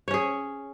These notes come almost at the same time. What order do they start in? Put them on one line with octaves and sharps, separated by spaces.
C#5 C#4 G#4